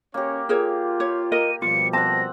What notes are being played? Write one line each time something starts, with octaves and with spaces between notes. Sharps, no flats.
A#3 C#4 G4 C#5
F4 G#4 A#4 C#5
G4 C#5
A#4 D#5 D#7
B2 F3 G3 F4 C#7
C4 F#5 A5 A#6